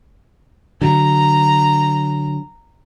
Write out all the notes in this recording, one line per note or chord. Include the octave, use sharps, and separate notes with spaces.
D3 F#3 A#5